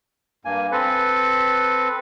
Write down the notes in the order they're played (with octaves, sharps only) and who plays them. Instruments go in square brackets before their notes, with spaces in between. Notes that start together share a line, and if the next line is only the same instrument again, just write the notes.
[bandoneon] G2 A#3 G#5
C4 A4 B4